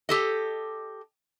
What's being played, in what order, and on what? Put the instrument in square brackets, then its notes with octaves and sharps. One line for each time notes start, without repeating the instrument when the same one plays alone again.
[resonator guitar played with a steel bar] G4 A4 D#5